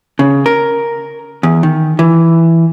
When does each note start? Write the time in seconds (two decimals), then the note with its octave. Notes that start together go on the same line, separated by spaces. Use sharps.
0.19 C#3
0.46 A#4
1.43 E2
1.63 D#3
1.99 E3